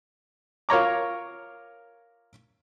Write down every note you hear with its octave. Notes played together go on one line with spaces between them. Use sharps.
F4 A#4 C#5 A#5 D6